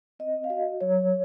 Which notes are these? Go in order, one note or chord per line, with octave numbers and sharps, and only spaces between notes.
C4 D#5
F5
F#4 D#5
F#3 C#5